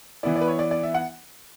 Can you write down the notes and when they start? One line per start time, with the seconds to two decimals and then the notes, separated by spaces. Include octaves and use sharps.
0.23 E3 B3 E4 D5
0.36 D5
0.41 B4
0.48 C#5
0.59 D5
0.71 D5
0.83 E5
0.94 F#5